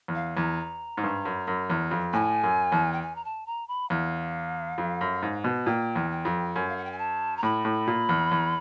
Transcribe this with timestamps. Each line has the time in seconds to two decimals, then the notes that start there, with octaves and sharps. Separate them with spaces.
0.08 E2
0.15 F5
0.37 E2 A#5
0.97 G#2
1.04 G2
1.25 F#2
1.47 F#2
1.70 E2
1.91 F2
2.13 A2 G#5
2.44 F#2
2.72 E2
2.93 G5
3.03 G#5
3.16 A#5
3.25 A5
3.46 A#5
3.68 B5
3.90 E2 F5
4.78 F2
5.01 F#2
5.23 G#2
5.44 B2
5.66 A#2 G5
5.96 E2
6.11 G5
6.25 F2
6.54 F#2 G#5
6.69 F5
6.77 F#5
6.85 G5
6.92 G#5
6.98 A5
7.37 A#5
7.43 A2 B5
7.65 A2
7.87 A#2
8.09 E2
8.31 E2